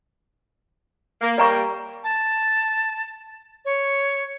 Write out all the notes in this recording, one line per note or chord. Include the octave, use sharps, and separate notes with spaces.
A#3
G3 A#3 D5 A#5 C#6
A5
C#5